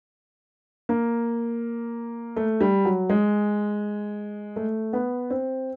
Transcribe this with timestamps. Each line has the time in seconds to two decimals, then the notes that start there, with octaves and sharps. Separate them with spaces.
0.89 A#3
2.36 A3
2.61 G3
2.85 F#3
3.10 G#3
4.56 A3
4.93 B3
5.30 C4